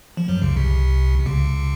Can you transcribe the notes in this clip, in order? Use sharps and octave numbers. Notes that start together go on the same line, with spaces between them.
F3
F#2 F#3
C#2 C#3
C2 C3
C3
C#2 C#3